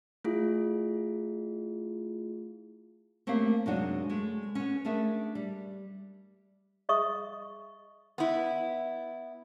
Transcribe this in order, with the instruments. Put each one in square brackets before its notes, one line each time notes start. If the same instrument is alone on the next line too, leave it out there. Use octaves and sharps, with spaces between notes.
[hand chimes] A3 E4 F4 G#4
[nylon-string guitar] A3 A#3 C4 C#4 G4 F5
F#2 C3 G#3 D4 D#4 F#4
G#3 A3
B3 C#4
A3 D4 G#4 A#4 E5
G3
[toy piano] G#4 D#5 E5 C#6 D#6
[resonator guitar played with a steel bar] B3 E4